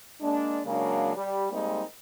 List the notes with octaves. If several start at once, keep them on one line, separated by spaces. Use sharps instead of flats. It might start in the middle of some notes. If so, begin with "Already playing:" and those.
G#3 A#3 D4
C#3 F#3 G#3 A#3 D4
G3
G3 G#3 A#3 C4 D#4